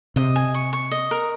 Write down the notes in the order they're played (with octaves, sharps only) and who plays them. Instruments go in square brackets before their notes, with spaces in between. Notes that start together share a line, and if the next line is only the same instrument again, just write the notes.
[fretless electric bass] C3 [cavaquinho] D#5
[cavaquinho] G#5
C#6
C#6
D#5
A#4